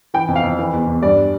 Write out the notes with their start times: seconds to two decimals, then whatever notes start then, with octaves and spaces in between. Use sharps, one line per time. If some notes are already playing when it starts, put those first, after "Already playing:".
0.14 E3 G5
0.28 F2
0.36 F5
0.43 F2
0.59 E3
0.73 E2
0.87 E2
1.02 G2 D5